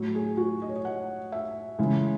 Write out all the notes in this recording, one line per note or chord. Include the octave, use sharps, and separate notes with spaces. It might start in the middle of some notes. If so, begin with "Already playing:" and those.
Already playing: A2 F#3
G#4
F#4
D#5
C#5
D#5
F#5
E5
C#3 E3 G#3